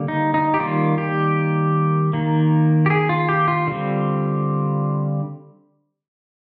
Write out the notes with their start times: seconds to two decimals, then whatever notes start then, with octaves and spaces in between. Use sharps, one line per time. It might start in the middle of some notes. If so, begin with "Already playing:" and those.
Already playing: D3 G3 A#3
0.08 D#4
0.34 D#4
0.54 G4
0.59 D#3 G3 A#3 F4
0.98 G4
2.13 D#3 A#3
2.86 G4
2.90 G#4
3.09 F4
3.29 G4
3.48 F4
3.67 D3 G3 C4